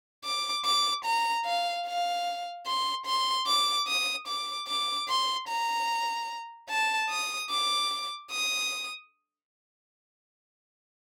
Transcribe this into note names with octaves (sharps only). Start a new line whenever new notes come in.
D6
D6
A#5
F5
F5
C6
C6
D6
D#6
D6
D6
C6
A#5
A5
D#6
D6
D#6